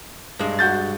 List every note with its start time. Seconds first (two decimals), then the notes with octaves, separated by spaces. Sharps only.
0.39 G2 G#3
0.59 F#4 G6 A6